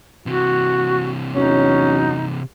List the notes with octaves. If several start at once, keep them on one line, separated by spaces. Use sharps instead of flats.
C3 E3 F#4
E2 F#3 C#4 D#4